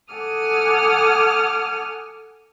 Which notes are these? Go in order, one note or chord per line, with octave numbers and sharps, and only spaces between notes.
A4 F#5 G#5 D6 D#6 F6